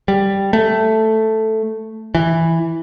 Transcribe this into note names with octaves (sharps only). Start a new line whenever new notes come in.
G3
A3
E3